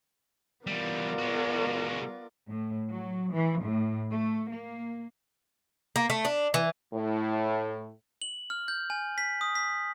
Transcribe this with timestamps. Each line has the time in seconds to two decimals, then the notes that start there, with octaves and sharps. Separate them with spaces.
0.67 E3 G3 B3 F4 A#4 D5
1.19 G#3 F#4
2.49 A2
2.89 F#3
3.33 E3
3.63 A2
4.11 A3
4.50 A#3
5.96 A#3
6.10 A3
6.25 D4
6.54 E3
6.94 A2
8.22 F#7
8.50 F6
8.68 G6
8.90 G#5
9.18 B6
9.41 D#6
9.55 B6